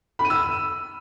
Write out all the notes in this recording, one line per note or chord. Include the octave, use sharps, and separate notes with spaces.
B5
D#7
E6